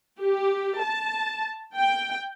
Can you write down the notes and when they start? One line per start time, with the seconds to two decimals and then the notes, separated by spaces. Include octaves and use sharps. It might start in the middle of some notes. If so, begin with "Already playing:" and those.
0.20 G4
0.81 A5
1.75 G5